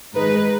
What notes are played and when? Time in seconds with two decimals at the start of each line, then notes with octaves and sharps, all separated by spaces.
0.14 G#2 D#3 G#3 D#4 B4